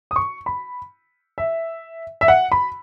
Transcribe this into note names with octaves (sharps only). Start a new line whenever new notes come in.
D#6
C#6
B5
E5
E5
F#5
B5